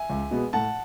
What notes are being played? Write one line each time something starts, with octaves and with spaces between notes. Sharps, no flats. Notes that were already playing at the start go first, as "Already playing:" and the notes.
Already playing: E5 G#5
C#2
B2 G#3 B3
A2 F#5 A5